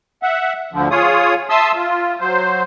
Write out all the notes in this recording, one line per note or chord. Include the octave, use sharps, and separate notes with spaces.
E5 F#5
D2 D3 F3
F4 G#4 C#5 D#6
E5 A5 C6 D#6 E6
F4
F#3 C5